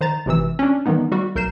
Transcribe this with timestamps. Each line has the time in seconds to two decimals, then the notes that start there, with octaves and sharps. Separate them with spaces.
0.01 D#3 C5 A#5 A6
0.26 G#1 C3 E3 E6
0.59 C#4 D4
0.86 D#3 E3 G3 B3 D#4
1.12 G3 F#4
1.36 B1 A#4 G6 C7 E7